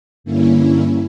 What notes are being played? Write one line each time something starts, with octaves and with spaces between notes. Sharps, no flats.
G2 D3 A#3 C#4 E4